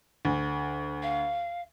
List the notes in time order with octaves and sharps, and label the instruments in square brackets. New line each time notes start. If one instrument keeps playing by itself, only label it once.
[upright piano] D2
[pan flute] F5